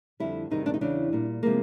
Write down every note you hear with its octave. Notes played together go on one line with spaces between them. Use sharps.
F2 D3 G3 E4
E2 C3 D#3 G3 D#4
D4
D#4
E2 C#3 E3 D4
A#2 G3
C3 F3 G#3 A#3